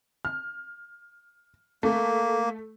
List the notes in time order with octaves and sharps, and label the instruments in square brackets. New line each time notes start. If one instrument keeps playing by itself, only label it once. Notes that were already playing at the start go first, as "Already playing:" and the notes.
[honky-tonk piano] F6
[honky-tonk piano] A3 [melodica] A#3